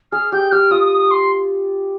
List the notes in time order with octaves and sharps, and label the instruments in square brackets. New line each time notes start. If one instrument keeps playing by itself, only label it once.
[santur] G#4 [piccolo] F6
[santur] G4 [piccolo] G6
[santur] G4 [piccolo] F6
[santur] F4 [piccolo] D#6
[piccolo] D#6
D#6
C6